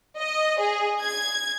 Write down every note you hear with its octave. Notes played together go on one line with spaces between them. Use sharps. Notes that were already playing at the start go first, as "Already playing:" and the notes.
D#5
G#4
G#6